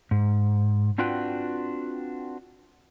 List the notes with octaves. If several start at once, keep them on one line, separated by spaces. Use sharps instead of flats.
G#2
C4 D4 F4 F#4 B4 G5